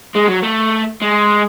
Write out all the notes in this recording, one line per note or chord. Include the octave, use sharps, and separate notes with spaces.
G#3
F#3
A3
G#3